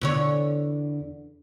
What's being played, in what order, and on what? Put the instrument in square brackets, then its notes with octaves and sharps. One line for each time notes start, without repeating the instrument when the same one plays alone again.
[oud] E2 D3 C#5